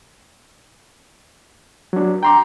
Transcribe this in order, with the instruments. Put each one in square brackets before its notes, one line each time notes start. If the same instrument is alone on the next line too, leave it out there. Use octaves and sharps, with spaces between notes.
[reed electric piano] F#3 D4
[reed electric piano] G5 C6 D6 [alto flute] A#5